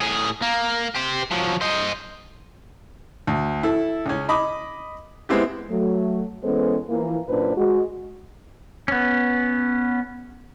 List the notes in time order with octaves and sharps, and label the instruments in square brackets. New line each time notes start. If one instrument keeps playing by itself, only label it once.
[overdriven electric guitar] A2 G#4
A#3
G4 C5
F3 F#3
C5 D#5
[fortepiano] D2
E4 A4
C#2 C#4
D#5 B5 D6 D#6
G#3 B3 C4 E4 G4
[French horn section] F#3 A3
E3 G#3 B3 C#4 A4 C5
E3 F3 A#3
F#2 A#2 A#3 D4 B4 C5
G#3 F#4
[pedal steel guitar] B3 C#4